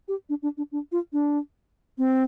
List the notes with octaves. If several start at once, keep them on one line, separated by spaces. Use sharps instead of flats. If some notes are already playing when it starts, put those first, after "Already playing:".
G4
D4
D4
D4
D4
F4
D4
C4